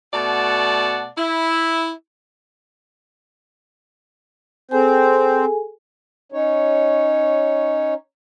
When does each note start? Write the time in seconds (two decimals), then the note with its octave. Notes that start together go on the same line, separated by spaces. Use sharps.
0.13 B2 A3 D5 F#5 A5
1.18 E4
4.71 C4 G#4 A4 C5 G#5
6.32 C#4 D#4 C#5